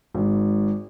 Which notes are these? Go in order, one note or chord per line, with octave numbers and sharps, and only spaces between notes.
G#1 G#2